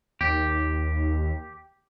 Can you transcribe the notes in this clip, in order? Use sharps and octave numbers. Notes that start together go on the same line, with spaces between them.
D#2 G4